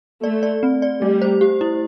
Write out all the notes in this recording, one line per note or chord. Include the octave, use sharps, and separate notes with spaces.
A3 D5
D5
C4
D5
G3 A3
C5
G4
E4